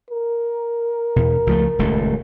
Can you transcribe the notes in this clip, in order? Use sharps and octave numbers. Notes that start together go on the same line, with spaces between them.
A#4
E2 B2
C#2 F3 A3
D#1 C#2 A3